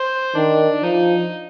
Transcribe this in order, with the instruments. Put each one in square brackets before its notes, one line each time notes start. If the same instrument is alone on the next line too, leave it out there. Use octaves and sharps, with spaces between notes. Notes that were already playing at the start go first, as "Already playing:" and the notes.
Already playing: [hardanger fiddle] C5
[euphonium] D#3 [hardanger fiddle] D4
[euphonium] F3 [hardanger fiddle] D#4